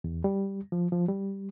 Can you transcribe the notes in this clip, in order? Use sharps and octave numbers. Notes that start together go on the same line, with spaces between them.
E2
G3
F3
F3
G3